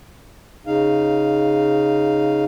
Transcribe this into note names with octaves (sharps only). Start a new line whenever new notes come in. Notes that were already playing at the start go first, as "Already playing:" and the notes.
C#3 D#4 F5